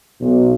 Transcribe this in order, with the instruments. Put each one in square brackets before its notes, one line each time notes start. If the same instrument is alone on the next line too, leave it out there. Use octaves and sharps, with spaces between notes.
[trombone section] B1